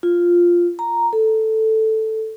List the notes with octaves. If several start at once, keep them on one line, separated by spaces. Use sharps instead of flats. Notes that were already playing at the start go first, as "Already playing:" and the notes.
F4
A#5
A4